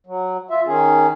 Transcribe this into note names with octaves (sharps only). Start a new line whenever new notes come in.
F#3
F4 E5
D#3 C#4 G#4